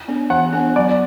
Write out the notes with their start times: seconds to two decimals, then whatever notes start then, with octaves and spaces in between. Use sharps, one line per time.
0.08 B3 D4
0.30 E3 F#5
0.53 B3 D4
0.76 F#3 D5